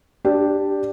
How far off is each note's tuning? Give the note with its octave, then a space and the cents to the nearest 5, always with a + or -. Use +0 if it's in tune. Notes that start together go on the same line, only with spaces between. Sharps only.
D4 +0 G4 +0